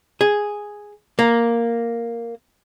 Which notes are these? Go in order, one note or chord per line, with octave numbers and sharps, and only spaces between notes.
G#4
A#3